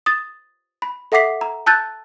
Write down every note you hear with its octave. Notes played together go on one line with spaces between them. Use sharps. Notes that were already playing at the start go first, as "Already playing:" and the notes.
D#6 A6
B5
A4 E5 F#5 D6 B6 C7
A#5
A5 E6 F#6 G6 A6